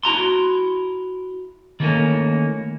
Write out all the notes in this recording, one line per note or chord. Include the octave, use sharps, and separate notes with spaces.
E4 F#4 A#5 C6
D#3 E3 G3 A3 A#3 C#4